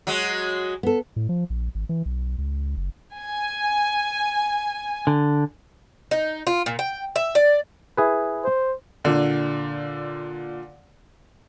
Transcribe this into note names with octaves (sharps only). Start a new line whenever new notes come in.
F#3 G#3
B3 A4
A2
F3
A#1
G#1
E3
B1
C#2
F#1
G#5
D3
D#4
F4
A#2
G5
E5
D5
E4 G#4 B4
C5
A#2 D3